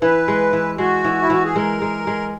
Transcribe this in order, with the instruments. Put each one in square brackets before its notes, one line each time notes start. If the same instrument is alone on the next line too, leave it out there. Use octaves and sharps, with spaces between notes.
[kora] E3 [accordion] B4
[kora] G#3
E3
[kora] G#3 [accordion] F#4
[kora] E3
[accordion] E4
[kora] E3 [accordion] F#4
[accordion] G#4
[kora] G#3 [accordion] A#4
[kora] G#3
G#3